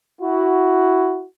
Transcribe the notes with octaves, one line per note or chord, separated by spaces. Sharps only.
E4 F#4